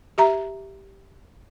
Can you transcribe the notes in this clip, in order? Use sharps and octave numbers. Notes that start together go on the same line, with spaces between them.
G4 E5 A#5